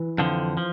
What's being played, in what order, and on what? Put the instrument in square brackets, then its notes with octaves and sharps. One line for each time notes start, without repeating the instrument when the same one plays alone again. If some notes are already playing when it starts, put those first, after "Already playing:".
Already playing: [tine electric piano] E3
[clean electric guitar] F2 D3 F3
F3